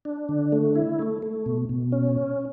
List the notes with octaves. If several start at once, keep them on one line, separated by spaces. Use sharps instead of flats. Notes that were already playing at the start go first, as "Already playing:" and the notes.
D4
D3
A3
E4
A3
A3
B2
B2
C#4